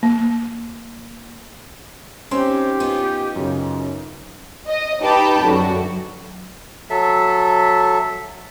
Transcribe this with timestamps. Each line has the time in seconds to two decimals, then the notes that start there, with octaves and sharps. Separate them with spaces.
0.03 A#3
2.31 C4 C#4 D#4 G4 C6
2.80 B3 D#4 F4
3.36 F#2 C#3
4.67 D#5
5.01 D#4 G4 B4 G5 A5 B5
5.43 F#2 D3 F#4
6.90 F#3 A4 E5